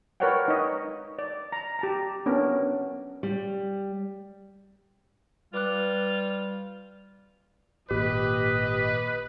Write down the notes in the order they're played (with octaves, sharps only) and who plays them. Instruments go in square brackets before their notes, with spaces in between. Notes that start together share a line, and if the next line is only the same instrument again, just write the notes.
[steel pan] A#4 B4 C#5 D5 F#5 G5
D#4 C#5 D#5
D5
A#5
G4 A5 A#5
B3 C#4 D4 A#4
[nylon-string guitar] G3
[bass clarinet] G3 [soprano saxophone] F4 [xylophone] B4 D6 F#6
[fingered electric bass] G#1 A#2 [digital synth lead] G4 [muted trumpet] B4 [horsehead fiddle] D#5